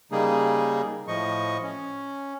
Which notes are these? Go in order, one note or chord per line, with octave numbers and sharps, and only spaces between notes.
C#3 G3 A#3 D#4 G#4
A2 F3 D#5 C#6
C#4